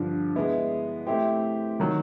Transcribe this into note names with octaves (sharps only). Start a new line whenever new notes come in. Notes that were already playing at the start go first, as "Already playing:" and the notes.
Already playing: G2 D3 F3
G#3 B3 E4
A3 C4 E4 G4 C5
D#3 F#3